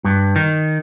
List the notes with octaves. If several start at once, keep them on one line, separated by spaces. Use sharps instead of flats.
G2
D#3